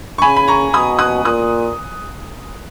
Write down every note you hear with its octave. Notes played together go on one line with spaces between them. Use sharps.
C#6
C#3 G#5 B5
B5
A#5 C#6
B2 B5 D#6
D#6 F#6
A#2 D#6 F#6